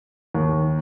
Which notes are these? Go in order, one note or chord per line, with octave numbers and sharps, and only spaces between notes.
D#2